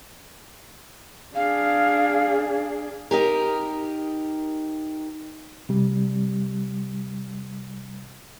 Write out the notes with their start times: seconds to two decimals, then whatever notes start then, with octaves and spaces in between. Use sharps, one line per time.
1.35 D4 G#4 F5
3.11 D#4 G4 A#4
5.69 C3 G3